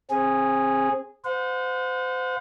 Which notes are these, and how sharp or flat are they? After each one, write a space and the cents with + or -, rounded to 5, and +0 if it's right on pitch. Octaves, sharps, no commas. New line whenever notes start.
C4 +30 G#4 -10
C5 -30 F#5 -45